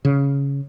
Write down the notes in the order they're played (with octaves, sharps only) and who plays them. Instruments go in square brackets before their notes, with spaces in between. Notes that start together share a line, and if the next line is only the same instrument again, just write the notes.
[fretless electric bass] C#3